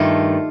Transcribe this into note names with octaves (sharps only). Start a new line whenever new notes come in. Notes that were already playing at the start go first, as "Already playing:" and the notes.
Already playing: G2 D#3 A3 F4 A4